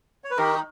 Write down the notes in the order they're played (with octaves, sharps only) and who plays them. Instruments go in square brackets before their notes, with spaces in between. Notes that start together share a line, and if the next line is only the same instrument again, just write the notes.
[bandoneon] C#5
B4
[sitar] D#3 [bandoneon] G4 A#4
[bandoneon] D#4